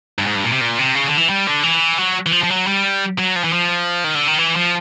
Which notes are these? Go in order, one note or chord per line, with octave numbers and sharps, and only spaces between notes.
G2
G#2
G2
A#2
C3
A#2
C3
C#3
D3
E3
G3
D3
E3
F#3
E3
F3
F3
F#3
G3
F#3
F3
E3
F3
D#3
D3
D#3
E3
F3